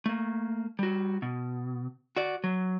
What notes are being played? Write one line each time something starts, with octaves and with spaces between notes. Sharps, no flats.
A3 A#3
G3 F#4
B2
F#4 D5
F#3